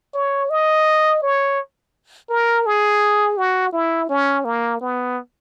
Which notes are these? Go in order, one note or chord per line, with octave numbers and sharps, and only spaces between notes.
C#5
D#5
C#5
A#4
G#4
F#4
E4
C#4
A#3
B3